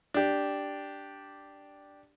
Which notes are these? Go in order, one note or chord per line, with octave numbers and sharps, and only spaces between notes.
D4 G4